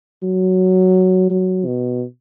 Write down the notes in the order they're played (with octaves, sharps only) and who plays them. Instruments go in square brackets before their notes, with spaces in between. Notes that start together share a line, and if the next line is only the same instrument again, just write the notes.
[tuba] F#3
F#3
B2